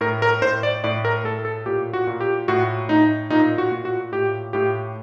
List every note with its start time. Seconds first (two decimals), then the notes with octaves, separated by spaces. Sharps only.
0.01 A2 A#4
0.22 A#4
0.42 A2 C5
0.63 D5
0.84 A2 D5
1.05 A#4
1.24 A2 A4
1.45 A4
1.66 A#2 G4
1.93 F#4
2.07 A#2
2.21 G4
2.48 A2 F#4
2.89 A2 D#4
3.30 A#2 D#4
3.58 F#4
3.72 A#2
3.85 F#4
4.12 A2 G4
4.53 A2 G4